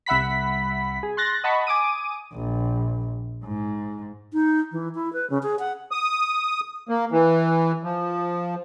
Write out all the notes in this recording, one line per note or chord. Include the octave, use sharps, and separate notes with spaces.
C2 E5 F#5 B5 B6
G#4
C6 F#6 A6 A#6
D#5 F#5 A5 B5 C#6
G#5 D6 D#6 D#7
A#1
G#2
D#4
E3
E4
B4
C#3
G#4
F#5
D#6
A#3
E3
F3